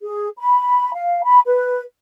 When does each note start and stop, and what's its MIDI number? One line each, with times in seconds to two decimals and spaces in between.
0.02 0.29 68
0.38 0.91 83
0.94 1.21 77
1.24 1.40 83
1.45 1.81 71